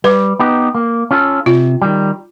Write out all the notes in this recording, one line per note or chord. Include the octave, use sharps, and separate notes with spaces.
G3 B4
B3 D#4 G4
A#3
C#4 F4 A4
C3 F4
D#3 G3